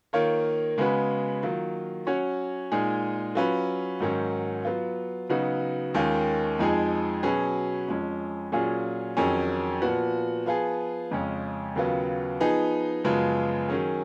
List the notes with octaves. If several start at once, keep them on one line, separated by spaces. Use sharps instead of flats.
D#3 A#3 F4 A#4 C#5
C#3 G#3 B3 F#4 B4
D#3 F#3 A#3 F4
F#3 C#4 F#4 C#5
A#2 G#3 D#4 G#4
F#3 C#4 F4 B4
G#2 D#3 F#3 C#4
F#3 B3 F4
C#3 F#3 B3 D#4 F#4
D#2 D#3 G#3 C#4 F4
F2 F3 G#3 D#4 G#4
B2 F#3 C#4 G#4 B4
F2 F3 G#3 C#4
A#2 F#3 C#4 F4 G#4
F2 D#3 F#3 C#4 G#4
A#2 F3 B3 F#4
F3 B3 F4 G#4
F2 C#3 G#3 C#4
D#2 C#3 F#3 B3 F4
F3 B3 D#4 G#4
F#2 C#3 F3 G#3 B3
D#3 F#3 C#4 G#4